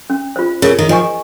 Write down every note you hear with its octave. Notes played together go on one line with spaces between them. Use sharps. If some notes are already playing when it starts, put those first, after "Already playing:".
C#4
F4 C5
C#3 A#4
D#3
F3 D#5 G#5 C#6